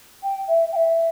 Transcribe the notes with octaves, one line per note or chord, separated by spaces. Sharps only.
G5
E5
G5
E5